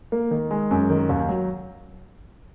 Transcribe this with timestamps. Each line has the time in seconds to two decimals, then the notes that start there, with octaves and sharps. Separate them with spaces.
0.12 A#3
0.31 D#3
0.51 G#3
0.71 F#2
0.90 D#3
1.09 D#2
1.29 F#3